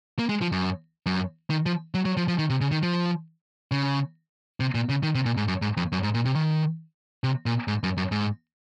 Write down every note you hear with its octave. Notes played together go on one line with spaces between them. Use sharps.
A#3
G#3
F3
F#2
F#2
D#3
F3
F#3
F#3
F3
F3
D#3
C3
C#3
D#3
F3
C#3
C3
A#2
C#3
D#3
C3
A#2
G#2
F#2
G#2
F2
F#2
G#2
A#2
C3
D#3
C3
A#2
G#2
F#2
F#2
G#2